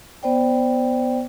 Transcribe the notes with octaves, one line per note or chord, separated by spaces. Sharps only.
B3 C5 D5 G5